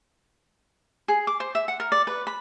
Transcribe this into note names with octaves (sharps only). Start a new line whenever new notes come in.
G#4
D6
C5
E5
F#5
A#4
D5
B4
B5